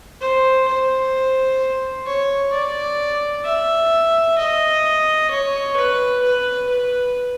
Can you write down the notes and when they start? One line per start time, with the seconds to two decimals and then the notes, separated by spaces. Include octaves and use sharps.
0.21 C5
0.68 C5
2.07 C#5
2.53 D5
3.45 E5
4.38 D#5
5.31 C#5
5.76 B4
6.23 B4
6.69 B4